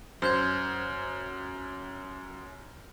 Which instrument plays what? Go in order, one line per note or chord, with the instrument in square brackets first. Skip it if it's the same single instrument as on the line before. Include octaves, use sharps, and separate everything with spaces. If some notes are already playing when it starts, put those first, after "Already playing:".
[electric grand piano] F#2 [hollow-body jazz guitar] C5 [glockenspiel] F6 G6 G#6